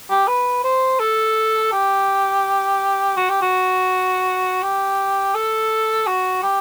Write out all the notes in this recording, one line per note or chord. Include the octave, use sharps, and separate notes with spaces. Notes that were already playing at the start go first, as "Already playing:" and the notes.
G4
B4
C5
A4
G4
F#4
G4
F#4
G4
A4
F#4
G4